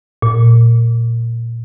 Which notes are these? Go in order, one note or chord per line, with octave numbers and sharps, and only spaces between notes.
A#2